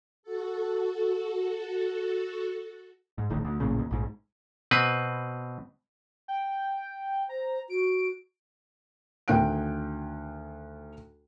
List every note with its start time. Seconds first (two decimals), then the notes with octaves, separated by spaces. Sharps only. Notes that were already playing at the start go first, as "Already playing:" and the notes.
0.23 F#4 A4
3.18 G#2
3.30 D1 A1 D2 D#3
3.45 D2
3.60 A1 F#2 A#2 C#3
3.79 D#2
3.91 A#1 G#2
4.71 B2 C4 B4
6.28 G5
7.29 C5 A#5
7.70 F#4 D7
9.28 D2 D#3 G5 F#6 D7